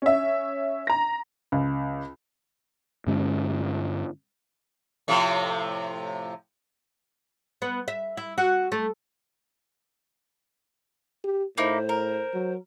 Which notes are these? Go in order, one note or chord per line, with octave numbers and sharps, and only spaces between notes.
C#4 E5
A#5 A#6
C#2
G2 D3 G#3 C#4
A2 C3 F3
B3
E5
E4
F#4
A3
G4
A2 A#3 D#4 E4 C5
A#4
F#3